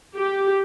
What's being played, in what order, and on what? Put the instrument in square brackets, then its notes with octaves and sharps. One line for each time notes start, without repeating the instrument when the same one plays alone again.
[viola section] G4